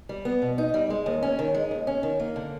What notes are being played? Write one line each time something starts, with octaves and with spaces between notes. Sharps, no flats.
G3
B3
B2
D#4
G3
G#3
D#2
C#4
D#3
G#3
D#2
C#4
D#3
A#3
D3